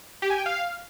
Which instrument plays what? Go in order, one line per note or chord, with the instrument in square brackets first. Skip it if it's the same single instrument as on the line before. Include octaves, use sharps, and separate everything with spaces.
[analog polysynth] G4
G#5
G5
F5